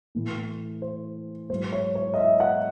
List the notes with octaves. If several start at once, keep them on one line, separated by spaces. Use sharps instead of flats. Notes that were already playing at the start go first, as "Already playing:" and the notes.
A2 E3
C5
G#2 F#3 C5
C#5
C#5
D#5
E5
F#5